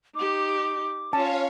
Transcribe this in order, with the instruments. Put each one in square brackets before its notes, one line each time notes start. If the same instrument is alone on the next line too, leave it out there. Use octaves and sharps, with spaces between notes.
[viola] D#4 G4 [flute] D6
[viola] C#4 F4 [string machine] C#5 F5 [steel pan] A5